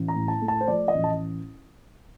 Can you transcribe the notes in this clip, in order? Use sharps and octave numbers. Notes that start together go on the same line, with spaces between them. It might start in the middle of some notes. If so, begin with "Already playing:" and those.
Already playing: A1
A#5
A2
A5
A3
A5
C5
F3 D5
D#5
A1
A5